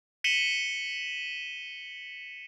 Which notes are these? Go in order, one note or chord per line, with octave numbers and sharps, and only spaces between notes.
B6 C#7 D#7 E7 F#7 G7